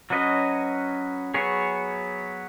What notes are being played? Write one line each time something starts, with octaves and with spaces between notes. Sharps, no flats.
F#3 C#4 F#4 B4 D#5
F#3 B3 G#4 C#5